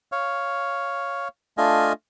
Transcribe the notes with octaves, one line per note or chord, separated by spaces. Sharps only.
C#5 F5
A3 D4 F4 D#5 F5 G#5